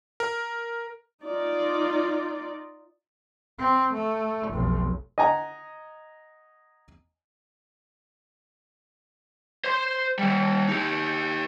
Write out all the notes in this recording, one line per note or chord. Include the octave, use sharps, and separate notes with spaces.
A#4
D#4 F4 D5
C4
A3
F1 B1
D#5 F#5 G#5 A#5
C5 C6
D#3 G3
D#4 G4